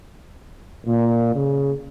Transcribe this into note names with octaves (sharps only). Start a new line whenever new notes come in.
A#2
C#3